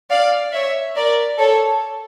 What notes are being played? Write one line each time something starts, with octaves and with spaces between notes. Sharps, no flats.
D5 F5
C#5 E5
A#4 D5
A4 C#5